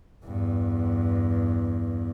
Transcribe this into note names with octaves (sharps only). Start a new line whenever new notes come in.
E2 G2